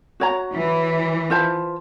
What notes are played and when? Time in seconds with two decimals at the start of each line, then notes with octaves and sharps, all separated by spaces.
0.20 F#4 C#5 A#5
0.54 E3
1.30 F4 C5 A5